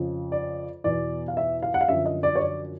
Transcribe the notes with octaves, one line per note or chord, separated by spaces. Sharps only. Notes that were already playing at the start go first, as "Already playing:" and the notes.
Already playing: F2 C#3 F3
D5
E2 B2 D5
F5
E5
F5
F#5
F5
F#2 D3 F3 E5
D#5
D5
C#5
D5